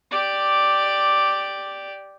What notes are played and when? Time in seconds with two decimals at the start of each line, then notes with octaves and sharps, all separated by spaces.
0.11 G4 D5